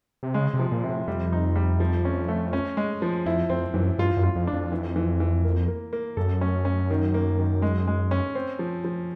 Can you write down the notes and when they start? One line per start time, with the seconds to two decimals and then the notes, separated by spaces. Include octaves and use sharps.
0.23 C3
0.34 C#3 G#3
0.54 C3
0.59 F3
0.72 A#2
0.84 C3
0.89 A2
1.08 F2 G3
1.32 D#4
1.55 G3
1.80 F3
2.05 C#4
2.28 A3
2.53 C#4
2.77 G#3
3.02 F3
3.26 F2 E4
3.50 F2 C4
3.74 F#2 E3
3.98 G2 F4
4.17 F#2
4.23 F4
4.35 F2
4.47 D4
4.53 F2
4.72 E3
4.96 E3
5.20 E3
5.44 A#3
5.68 A#3
5.93 A#3
6.17 F#2 A4
6.41 C#4
6.65 C#4
6.90 D#3
7.14 A#3
7.39 D#3
7.62 G#3
7.87 G#3
8.11 C#4
8.35 C4
8.59 F3
8.84 F3